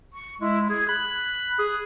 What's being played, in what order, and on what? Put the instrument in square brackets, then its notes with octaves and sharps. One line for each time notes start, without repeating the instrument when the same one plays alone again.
[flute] C#6
[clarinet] G#3 [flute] E4
[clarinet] G#4 [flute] G#6
[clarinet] B5 [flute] F#6
[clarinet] G#4